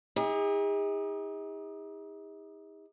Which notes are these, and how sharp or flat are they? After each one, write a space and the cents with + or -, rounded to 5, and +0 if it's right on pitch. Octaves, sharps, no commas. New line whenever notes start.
D#4 +35 G#4 -45